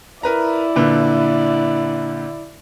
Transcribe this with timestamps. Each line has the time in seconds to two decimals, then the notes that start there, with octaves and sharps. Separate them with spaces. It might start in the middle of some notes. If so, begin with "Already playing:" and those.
0.23 E4 A#4 B4 D5 A#5
0.76 A#2 D3 B4